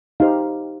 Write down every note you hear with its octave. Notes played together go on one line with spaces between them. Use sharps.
D#4 G4 C5 F5